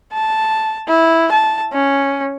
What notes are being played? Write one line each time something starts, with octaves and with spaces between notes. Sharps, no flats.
A5
E4
A5
C#4